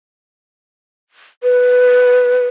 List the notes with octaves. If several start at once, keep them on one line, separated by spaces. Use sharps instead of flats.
B4